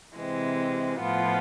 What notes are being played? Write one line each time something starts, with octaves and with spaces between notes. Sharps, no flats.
C3 E3 G#3 C4
A2 F3 B3 F4